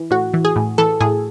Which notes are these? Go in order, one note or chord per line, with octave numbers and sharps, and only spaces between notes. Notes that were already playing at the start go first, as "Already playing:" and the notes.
Already playing: E3
A2 F#4
E3
G#4
A2
E3 A4
A2 G#4